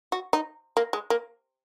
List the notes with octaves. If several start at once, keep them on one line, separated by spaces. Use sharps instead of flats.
F#4
D#4
A#3
G#3
A#3